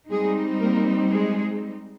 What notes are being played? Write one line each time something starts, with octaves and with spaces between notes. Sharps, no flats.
G3 G#3 C4 D#4 G#4
A#3 A#4
G#3 G#4